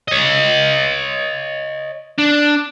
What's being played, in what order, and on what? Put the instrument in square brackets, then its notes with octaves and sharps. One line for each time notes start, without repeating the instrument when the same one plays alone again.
[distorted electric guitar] C#5 D#5
D4